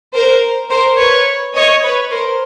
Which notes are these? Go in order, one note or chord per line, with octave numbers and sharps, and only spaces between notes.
A#4 C5
A#4 C5
B4 C#5
C#5 D#5
B4 C#5
A#4 C5